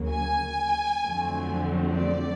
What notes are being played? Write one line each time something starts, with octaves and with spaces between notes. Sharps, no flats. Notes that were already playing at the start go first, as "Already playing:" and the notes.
Already playing: D2 C#3 F#3 A#3
G#5
F2 D3 F#3 A3 C4
D5